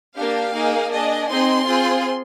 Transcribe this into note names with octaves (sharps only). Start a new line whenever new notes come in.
A#3 D4 G4 F5
A#3 D#4 G#4
D4 G#4 D#5
C4 D#4 G#4 C6
C4 F4 G#4